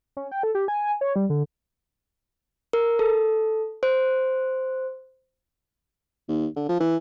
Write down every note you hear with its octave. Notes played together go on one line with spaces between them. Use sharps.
C#4
G5
A4
G4
G#5
C#5
G3
D3
A#4
A4
C5
D#2
D3
F3
E3